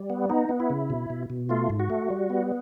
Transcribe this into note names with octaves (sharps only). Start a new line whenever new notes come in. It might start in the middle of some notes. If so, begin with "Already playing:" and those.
Already playing: G3
B3
B3 D#4
B3
E4
C#3
B2
B2
B2
A3 F4
G#2
F#4
A3
G3
B3